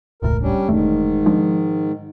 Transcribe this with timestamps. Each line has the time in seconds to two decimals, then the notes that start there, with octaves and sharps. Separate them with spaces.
0.22 E1 C#2 A2 A#4
0.42 G3 C#4 D4
0.69 E1 E2 G#2 D#3 A3
1.26 F3 G#3 D4